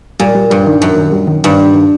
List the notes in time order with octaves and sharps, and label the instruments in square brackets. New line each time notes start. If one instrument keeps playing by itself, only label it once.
[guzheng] A#2 [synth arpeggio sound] G3
[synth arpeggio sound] G3
[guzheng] G2 [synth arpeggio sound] G3
[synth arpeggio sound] D#3
[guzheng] F#2 [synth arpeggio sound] D#3
[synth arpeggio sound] D#3
G3
D#3
[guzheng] G2 [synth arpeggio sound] D#3
[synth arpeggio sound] D#3
D#3